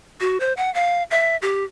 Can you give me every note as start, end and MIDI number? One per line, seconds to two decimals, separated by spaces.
0.20 0.38 66
0.40 0.53 72
0.57 0.72 78
0.74 1.03 77
1.11 1.37 76
1.42 1.64 67